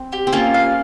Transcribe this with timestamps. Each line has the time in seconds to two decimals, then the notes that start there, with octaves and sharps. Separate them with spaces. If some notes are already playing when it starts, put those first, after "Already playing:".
Already playing: C4
0.12 G4
0.27 C4
0.33 A#3 C#4 F4
0.54 F5